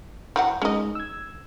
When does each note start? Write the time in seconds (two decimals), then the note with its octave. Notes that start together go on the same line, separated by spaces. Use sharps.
0.36 E3 F#3 F#5 G5
0.62 G#3 C#4 D#4 D#5
0.95 E6 G#6